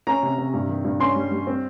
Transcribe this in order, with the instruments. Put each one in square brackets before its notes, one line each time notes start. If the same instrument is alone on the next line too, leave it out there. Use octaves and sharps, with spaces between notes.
[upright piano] C#4 A#5
C3
C3
G2
D#3
G2
C#4 C6
G3
G3
C4